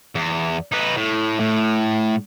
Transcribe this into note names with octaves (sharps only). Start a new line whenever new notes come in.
E2
D#4 B4
A2
A2